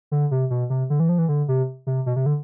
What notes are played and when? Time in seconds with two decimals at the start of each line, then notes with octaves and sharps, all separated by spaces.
0.11 D3
0.31 C3
0.50 B2
0.70 C3
0.90 D3
1.00 E3
1.09 F3
1.18 E3
1.29 D3
1.48 C3
1.87 C3
2.06 B2
2.16 C3
2.26 D3